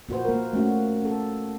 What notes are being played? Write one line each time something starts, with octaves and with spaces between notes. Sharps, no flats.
A#2 F#4 B4 C5
A#3 A#4
A3 A#3 C#4 F#4
C#4 A4